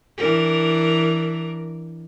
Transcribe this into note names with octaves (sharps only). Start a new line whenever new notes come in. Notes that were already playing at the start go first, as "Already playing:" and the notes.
E3 D4 A#4